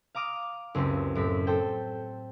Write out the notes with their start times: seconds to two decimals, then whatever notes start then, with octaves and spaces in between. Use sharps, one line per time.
0.15 F5 A#5 D6 D#6 F6
0.75 F#1 C#2 C4 G4
1.15 F#2 A2 C4 B6
1.47 A4 C5 G5